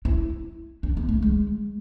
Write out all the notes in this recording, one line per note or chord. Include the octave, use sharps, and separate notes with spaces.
E4
D4
B3
A3
G#3